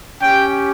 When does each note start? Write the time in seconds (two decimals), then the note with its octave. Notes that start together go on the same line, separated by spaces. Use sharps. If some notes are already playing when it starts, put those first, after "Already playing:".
0.21 C#4 G4 G5